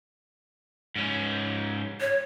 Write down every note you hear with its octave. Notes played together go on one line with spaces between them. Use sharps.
G#2 C#4
C#5